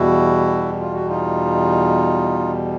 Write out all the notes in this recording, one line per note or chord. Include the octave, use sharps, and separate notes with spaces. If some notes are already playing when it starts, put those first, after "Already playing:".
Already playing: E2 B2 G3 E4 F#4
F4
F#4
D#4 F4